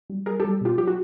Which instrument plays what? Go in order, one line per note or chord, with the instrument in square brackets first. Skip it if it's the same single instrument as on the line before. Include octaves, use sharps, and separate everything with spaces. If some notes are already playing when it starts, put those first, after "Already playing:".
[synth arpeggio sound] G3
G3 G#4 A#4
G3 G4 A4
B2 F4 G4
F#3 G4
F#4